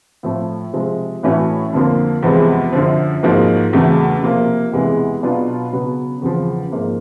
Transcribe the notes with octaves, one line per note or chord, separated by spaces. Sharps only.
A2 F3 A3
C3 F3 G#3
A2 E3 A3 C#4 F#4
F2 D3 F3 A#3
E2 C3 F3 G#3 B3
F#2 D3 F3
G#2 F3 A#3 D#4 F#4
E2 C#3 F#3 A3
C3 F3 A#3
E2 C3 E3 G#3 B3
B2 F#3 B3 D4 F4
C#3 F#3 B3
E2 C#3 F3
G#2 F3 A#3